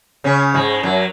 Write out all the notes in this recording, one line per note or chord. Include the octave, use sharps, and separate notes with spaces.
C#3 C#4
G#2 G#3
F#2 F#3